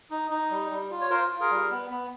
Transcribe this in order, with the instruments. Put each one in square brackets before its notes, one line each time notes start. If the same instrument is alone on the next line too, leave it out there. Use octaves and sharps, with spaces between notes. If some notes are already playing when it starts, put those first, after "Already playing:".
[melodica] D#4
D#4
G3
G3
F4
C#5
F4 A#4 C5
F4
G#4 A#4
G3
B3
B3